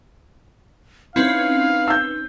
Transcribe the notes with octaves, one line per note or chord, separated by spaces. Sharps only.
C4 C#4 D#4 E4 B4 F5
E6 G6